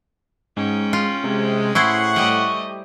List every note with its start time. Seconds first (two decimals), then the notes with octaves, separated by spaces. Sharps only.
0.57 G#2 C#4 G5
0.93 F4
1.24 C3 G#3
1.75 A2 E4 G#4 C5 F#5 C#6
2.16 G3 A3 G4 D#5